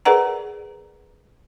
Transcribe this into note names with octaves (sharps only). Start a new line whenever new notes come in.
G#4 A#4 B4 D5 F#5 A#5